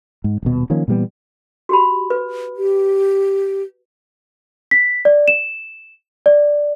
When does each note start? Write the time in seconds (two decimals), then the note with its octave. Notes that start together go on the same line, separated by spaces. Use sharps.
0.24 G#2
0.43 D#1 B2
0.70 D#3 F3 A#3 C#4
0.88 A#2 E3 G3 B3
1.69 F#4 G4 B5
2.10 B4
2.57 G4
4.71 B6
5.05 D5
5.28 E7
6.26 D5